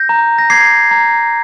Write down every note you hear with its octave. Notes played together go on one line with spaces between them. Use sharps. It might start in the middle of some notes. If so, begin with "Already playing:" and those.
Already playing: G6 A#6
A#5
A#6
D6 G#6 C7
A#5